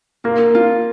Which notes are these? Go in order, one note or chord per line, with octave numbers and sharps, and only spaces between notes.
A#3 F4
F4